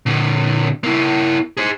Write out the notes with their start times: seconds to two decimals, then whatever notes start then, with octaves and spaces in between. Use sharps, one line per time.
0.06 A#2 D3
0.84 A#3 E4
1.57 G#4 C5